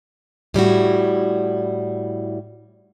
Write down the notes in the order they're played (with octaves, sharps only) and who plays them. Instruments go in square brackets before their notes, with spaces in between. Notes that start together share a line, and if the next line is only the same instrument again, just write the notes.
[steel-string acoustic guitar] A2 G3 E4 F#4